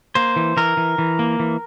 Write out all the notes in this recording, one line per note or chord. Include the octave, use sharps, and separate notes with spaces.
A#3 C5
E3
E3 A#4
E3
E3
A#3
E3